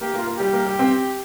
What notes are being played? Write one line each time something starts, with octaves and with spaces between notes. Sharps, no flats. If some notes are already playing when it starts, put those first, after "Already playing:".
A#3 G4
A#3 F4
A#3
G4
G3
A#3
G3
C4